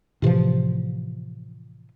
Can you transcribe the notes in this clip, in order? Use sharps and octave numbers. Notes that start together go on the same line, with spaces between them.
A2 C3 E3 F3